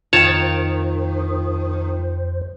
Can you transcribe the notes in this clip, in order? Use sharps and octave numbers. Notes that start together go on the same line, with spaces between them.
F2 D#3 F4 C5 C#5 G5 A5